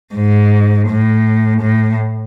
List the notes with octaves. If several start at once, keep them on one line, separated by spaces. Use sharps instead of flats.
G#2
A2
A2